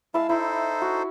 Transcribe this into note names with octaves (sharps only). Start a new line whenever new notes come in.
G#3 E4 F5 A5 E6
D#4 E4 A4 C5
F#4